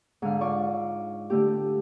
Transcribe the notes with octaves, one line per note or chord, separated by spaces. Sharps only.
G#2 D3 F5
F4 D5 C#6 D6
D3 A3 G4